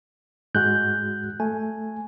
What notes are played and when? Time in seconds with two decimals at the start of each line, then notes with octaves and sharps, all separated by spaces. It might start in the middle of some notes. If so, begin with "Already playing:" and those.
0.55 G#2 G#3 F#4 F#6 G6
1.40 A3 G#5